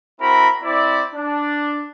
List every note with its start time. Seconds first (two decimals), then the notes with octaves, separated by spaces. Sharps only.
0.20 C4 E4 F#4 A#4 A#5 B5
0.63 C4 E4 D5
1.15 D4